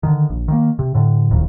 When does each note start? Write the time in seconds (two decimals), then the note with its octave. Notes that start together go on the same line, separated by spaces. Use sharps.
0.03 D3 D#3
0.30 A#1
0.48 D#3 G3 A#3
0.79 C3
0.94 A2 D3
1.31 D1 A#1 D#2 D#3